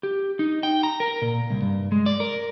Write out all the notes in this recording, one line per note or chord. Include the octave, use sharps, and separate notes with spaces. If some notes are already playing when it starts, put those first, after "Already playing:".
G4
D#4
G5
A#5
A#4
A#2
C2
G2
G#3
D5
A#4